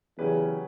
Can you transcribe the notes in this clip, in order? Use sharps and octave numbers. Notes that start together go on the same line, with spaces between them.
E2 C#3 F#3 C#4 G4 B4